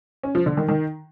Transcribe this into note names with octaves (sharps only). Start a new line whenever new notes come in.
C#4
F3
D3
D#3
D#3